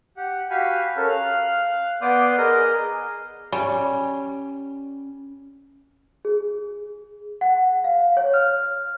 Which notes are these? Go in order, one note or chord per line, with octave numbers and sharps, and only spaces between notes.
G4 F#5
F#4 G4 F5 G#5 B5
C#4 A4 A#4
F5 F6 F#6
B3 D5 C6 D6 D#6 G6
G#4 A#4 D#5
G3 C#4
G#4
F#5
F5
C#5
F6